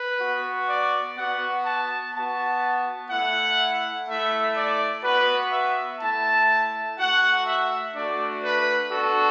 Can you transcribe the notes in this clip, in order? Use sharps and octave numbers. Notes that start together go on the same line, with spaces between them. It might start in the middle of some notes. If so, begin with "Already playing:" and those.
Already playing: B4
B3 F#4
D5
B3 F#4 F#5
A5
B3 F#4 A5
A3 E4 F#5
A3 E4 E5
D5
B3 F#4 B4
E5
A3 E4 A5
A3 F#4 F#5
E5
A3 D4 F#4 D5
B4
B3 D4 F#4 A4